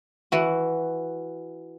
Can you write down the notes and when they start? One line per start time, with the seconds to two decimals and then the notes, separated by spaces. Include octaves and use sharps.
0.32 E3 F#4